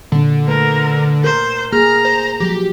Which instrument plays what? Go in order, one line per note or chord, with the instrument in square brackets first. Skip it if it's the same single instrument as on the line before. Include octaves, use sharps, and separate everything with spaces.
[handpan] A#2 D4 [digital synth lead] D3
[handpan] A3 B4 [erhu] A#4
[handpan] A#4 [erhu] C5
[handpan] A#3 G#4 [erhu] A#5 [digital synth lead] F6
[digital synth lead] C5
[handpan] F3 F#3 [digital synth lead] G4